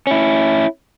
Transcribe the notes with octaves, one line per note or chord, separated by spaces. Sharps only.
C#4 E4